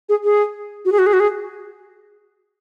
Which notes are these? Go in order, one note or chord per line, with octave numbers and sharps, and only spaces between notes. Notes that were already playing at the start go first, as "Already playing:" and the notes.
G#4
G#4
F#4
G#4
F#4
G#4
F#4
G#4